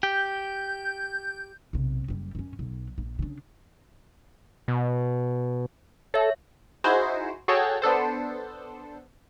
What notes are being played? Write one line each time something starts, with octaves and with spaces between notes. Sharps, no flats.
G4 G6
B1 C3
F#1 G3
F#2 C#4
B1 F#3
A#1
C#3 D4
B2
A4 C#5 E5
D#4 E4 F#4 G#4 C5
F#4 G#4 A4 C#5 G5 A5
B3 D4 A4 C5